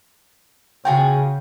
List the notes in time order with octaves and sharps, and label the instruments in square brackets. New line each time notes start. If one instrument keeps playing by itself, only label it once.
[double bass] C#3 [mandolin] F4 F#4 G#4 [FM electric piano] G5